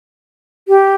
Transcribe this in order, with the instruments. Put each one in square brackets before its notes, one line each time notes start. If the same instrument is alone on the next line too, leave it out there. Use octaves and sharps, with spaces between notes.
[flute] G4